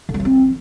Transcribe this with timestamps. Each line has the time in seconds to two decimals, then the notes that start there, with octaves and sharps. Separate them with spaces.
0.09 D3
0.14 G3
0.20 F#3
0.25 C4